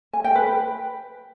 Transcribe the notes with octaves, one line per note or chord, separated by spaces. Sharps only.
G#5
G5
B4
B4